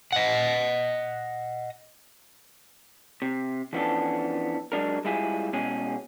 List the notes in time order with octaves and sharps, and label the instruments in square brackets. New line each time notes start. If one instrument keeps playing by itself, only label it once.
[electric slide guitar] D#5 F#5
[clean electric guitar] C3
E3 F3 B3 C#4 D4 A4
F#3 G#3 D4 A#4
G3 G#3 E4 F4 G#4
B2 G#3 C#4 G#4